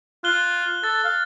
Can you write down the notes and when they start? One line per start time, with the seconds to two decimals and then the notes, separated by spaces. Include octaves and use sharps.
0.24 F4 F#6 G7
0.84 A4 A6
1.04 F5